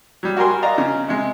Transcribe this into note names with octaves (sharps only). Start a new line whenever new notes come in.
F#3 G3
F#4 G4 A#4 G#5 C6
D5 D#5 F5 A#5
C#3
C3 G#3